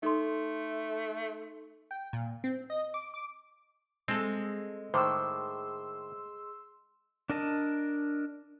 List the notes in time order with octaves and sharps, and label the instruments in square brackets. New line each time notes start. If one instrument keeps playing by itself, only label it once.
[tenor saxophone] A3 [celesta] D#4 A4 C6
[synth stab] G5
A#2
C4
D#5
D6
D6
[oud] G#3 A4 [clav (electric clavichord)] C4
[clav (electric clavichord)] A2 D#3 [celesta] C5 D6 [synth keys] C6 E6
[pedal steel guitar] D4 A#4 D#5 A5